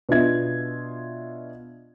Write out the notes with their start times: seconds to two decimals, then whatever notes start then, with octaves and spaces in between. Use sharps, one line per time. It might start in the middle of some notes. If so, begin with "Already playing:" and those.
0.09 B2 D4 F4 D#5 E5 G#6